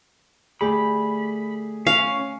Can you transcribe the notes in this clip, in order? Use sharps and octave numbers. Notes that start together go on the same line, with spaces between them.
D3 A3 G4 G#4 B5
C#4 F5